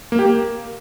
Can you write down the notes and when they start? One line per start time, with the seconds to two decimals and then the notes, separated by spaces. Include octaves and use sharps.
0.12 A#3
0.19 G4
0.26 A#3